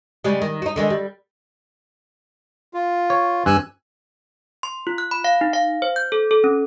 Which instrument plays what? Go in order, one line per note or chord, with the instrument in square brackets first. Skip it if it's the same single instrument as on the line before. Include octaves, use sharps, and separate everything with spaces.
[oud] C#3 G3 G#3
D#3
D#4 F#4
D3 D#3 G#3
G3
[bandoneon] F4
[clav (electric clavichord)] C#5
[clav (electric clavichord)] G2 [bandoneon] G#5 E6 F#6
[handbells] C6
F4
F#6
B5
F5
D#4
F5
C5
G6
A4
A4
C#4